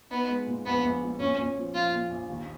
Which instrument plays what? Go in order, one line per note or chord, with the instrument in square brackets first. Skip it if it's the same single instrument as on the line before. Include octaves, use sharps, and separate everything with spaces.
[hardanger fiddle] B3 [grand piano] D#4
[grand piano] G#3
A#2
[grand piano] A#1 [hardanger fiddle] B3
[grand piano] A#1
A#2
[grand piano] A#2 [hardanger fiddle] C#4
[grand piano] A#2
F3
[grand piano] F3 [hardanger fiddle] F4
[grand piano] A#2
A#1
D#2